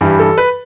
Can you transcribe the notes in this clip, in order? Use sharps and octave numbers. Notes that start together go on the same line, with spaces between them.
G2 E3 G3 G4
A4
B4